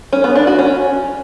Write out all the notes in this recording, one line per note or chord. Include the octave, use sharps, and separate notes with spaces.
C#4
B3
D4
F#4
C#4